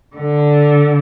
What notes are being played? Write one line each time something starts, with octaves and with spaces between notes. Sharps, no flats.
D3